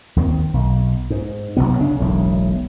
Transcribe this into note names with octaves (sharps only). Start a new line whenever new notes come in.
D#2 D#3 F#3 C4
B1
G#2
F#1 B1 C3 B3
C#3 D4
E1 B1 A2